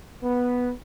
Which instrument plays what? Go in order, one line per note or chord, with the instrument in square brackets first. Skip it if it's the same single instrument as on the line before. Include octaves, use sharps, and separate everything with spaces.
[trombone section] B3